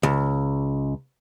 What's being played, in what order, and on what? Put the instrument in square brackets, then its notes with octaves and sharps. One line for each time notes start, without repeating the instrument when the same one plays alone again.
[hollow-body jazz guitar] C#2